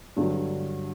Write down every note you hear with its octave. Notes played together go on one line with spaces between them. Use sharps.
G2 D3 F#3